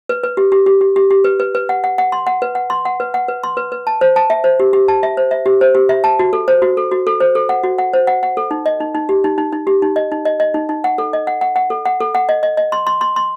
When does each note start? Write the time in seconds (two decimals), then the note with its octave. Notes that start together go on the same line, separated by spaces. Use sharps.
0.09 B4
0.24 B4
0.37 G4
0.52 G4
0.66 G4
0.81 G4
0.96 G4
1.11 G4
1.24 B4
1.40 B4
1.55 B4
1.69 F#5
1.84 F#5
1.98 F#5
2.12 C6
2.27 F#5
2.42 B4
2.55 F#5
2.70 C6
2.85 F#5
3.00 B4
3.14 F#5
3.28 B4
3.43 C6
3.57 B4
3.72 B4
3.87 A5
4.01 C5
4.16 A5
4.30 E5
4.44 C5
4.60 G4
4.73 G4
4.88 A5
5.03 E5
5.17 C5
5.31 E5
5.46 G4
5.61 C5
5.75 G4
5.89 E5
6.04 A5
6.19 F#4
6.33 A4
6.48 C5
6.62 F#4
6.77 A4
6.91 F#4
7.07 A4
7.20 C5
7.35 A4
7.49 F#5
7.64 F#4
7.78 F#5
7.93 C5
8.07 F#5
8.23 F#5
8.37 A4
8.51 D#4
8.66 D#5
8.80 D#4
8.95 D#4
9.09 G4
9.24 D#4
9.38 D#4
9.52 D#4
9.67 G4
9.82 D#4
9.96 D#5
10.12 D#4
10.25 D#5
10.40 D#5
10.54 D#4
10.69 D#4
10.84 F#5
10.98 A4
11.13 D#5
11.27 F#5
11.41 F#5
11.56 F#5
11.70 A4
11.85 F#5
12.00 A4
12.15 F#5
12.29 D#5
12.43 D#5
12.57 D#5
12.72 C6
12.87 C6
13.01 C6
13.16 C6